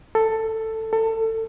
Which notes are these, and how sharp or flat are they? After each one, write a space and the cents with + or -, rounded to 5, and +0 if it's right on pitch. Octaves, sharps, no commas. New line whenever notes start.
A4 +10
A4 +25